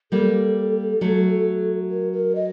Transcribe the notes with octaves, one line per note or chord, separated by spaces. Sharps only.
G3 A#3 A4
F#3 A3
A#4
A#4
D#5